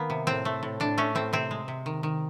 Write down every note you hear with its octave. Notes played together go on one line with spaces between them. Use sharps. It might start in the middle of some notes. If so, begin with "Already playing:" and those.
Already playing: D#3 A#3 B3
C3
A2 C4
A3
A2
A2 D4
A3 C#4
A2 C4
C3 C4
G#3
C3
D#3
D#3